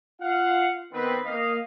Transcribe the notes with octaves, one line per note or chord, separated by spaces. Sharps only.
F4 F5 F#5
D#3 B3 C4 B4
A#3 D#5 F5